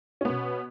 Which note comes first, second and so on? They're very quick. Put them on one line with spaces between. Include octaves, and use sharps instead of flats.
C#4 B3 B2